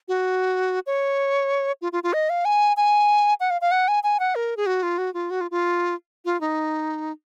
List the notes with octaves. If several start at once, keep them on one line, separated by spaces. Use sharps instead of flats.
F#4
C#5
F4
F4
F4
D#5
F5
G#5
G#5
F#5
F5
F5
F#5
G#5
G#5
F#5
A#4
G#4
F#4
F4
F#4
F4
F#4
F4
F4
F4
D#4